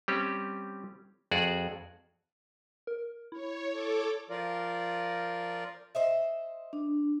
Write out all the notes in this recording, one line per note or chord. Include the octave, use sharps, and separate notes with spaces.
G3 C4 C#4 G4
F2 F#4 G#4 D5
A#4
E4 C#5
A4 C#5 D6
F3 F4 A#4 D5
C5 D#5 E5
D4